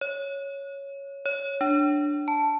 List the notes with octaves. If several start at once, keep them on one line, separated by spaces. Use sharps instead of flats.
C#5
C#5
D4
A5